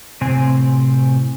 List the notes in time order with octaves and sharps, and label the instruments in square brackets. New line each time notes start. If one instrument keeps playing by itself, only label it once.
[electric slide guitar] A2 C3 C4 G#5